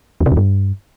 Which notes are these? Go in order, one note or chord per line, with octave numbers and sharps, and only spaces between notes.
E2
C3
E2
G2